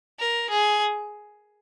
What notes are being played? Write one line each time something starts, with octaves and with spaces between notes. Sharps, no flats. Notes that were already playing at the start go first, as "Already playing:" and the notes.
A#4
G#4